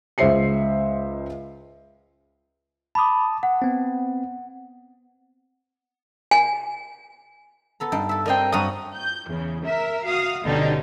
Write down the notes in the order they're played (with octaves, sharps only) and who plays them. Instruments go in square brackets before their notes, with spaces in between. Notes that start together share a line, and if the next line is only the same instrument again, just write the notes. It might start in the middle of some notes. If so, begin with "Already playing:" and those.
[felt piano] C#2 G#3 C5 E5 C7 C#7
[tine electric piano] A5 D#6 [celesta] B5 D6
[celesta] F#5
[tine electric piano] B3 C4
[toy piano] G#5
[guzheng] B3 A4 A#5
G2 D#4 G5
A4 E5
[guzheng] G3 C4 [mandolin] A#4 D#5 G5
[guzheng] G2 F#3 [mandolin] F#4 A#5 D#6
[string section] G6
E2 C#3
A#4 E5
F#4 F5 D#6
G1 B2 D3 C#4 D#4 G4